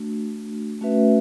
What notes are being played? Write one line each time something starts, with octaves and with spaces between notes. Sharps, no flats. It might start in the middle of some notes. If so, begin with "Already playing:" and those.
Already playing: A3 D4 F#4
A3 C#4 F#4 B4 E5